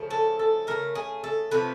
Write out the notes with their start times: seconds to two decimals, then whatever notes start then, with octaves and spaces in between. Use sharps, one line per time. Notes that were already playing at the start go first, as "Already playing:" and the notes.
Already playing: C#3 F3 A3
0.11 A4
0.39 A4
0.67 C#3 F3 A3 A#4
0.95 G#4
1.24 A4
1.51 C3 F3 A3 B4